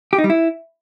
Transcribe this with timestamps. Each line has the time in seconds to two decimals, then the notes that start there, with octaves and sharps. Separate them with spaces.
0.13 G4
0.18 D#4
0.24 G3
0.30 E4